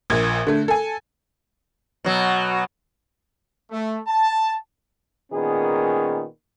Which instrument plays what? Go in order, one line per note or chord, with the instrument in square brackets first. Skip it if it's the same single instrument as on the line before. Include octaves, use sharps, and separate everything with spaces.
[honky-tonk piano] A#1 A#2 G#6
D3 A3
A4 G#5
[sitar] B2 F#3
[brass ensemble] A3
A5
[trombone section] A#2 D#3 B3 C#4 G#4